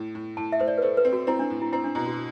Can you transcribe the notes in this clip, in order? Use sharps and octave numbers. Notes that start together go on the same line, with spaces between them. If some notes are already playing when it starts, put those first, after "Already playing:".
Already playing: A2
A2
A2 A5
E5
A2 C5
D5
B4
A3 C5
B4
C4
F#4
C4 E4
D4
A2
E4
C4 E4
D4
B2 E4
F#4